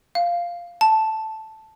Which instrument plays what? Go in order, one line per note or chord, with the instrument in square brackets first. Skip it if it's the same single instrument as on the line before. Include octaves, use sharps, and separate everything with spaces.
[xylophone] F5
A5